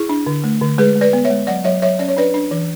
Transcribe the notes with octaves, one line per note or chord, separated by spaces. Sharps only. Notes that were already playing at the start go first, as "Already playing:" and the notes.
Already playing: E4 G#4
D4
D3
A3
D3
G#3 G#4 B4
G#3
B4 D5
B3
C#5 E5
G#3
F#3 D5 F#5
F#3 C#5 E5
F#3 C#5 E5
C#4 D5
C#5
D4 B4 D5
D4
E3